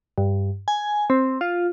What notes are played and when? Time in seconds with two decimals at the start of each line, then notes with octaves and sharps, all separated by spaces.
0.18 G2
0.68 G#5
1.10 C4
1.41 F4